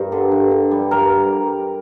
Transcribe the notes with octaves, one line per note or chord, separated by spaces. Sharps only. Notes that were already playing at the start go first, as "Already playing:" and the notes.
Already playing: G2 G3 A#4
D3
G2
D3
G3
G2 A#4